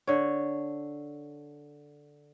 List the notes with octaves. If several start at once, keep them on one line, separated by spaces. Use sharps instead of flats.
D3 C#5